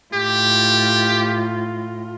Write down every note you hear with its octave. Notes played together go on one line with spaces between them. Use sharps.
A2 F4 G4